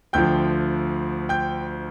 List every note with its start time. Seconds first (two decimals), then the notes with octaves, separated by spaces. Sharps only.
0.13 D2 D3 F3 G5 G6
1.29 G5 G6